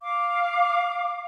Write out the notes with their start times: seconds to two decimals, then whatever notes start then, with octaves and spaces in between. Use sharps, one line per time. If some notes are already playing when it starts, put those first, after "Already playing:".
0.02 F5 D6